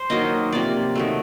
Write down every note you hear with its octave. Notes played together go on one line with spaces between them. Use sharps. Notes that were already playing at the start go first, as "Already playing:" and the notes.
Already playing: C5
D#3 F#3 A#3 D#5
C3 F3 A#3 D5
D#3 F#3 A3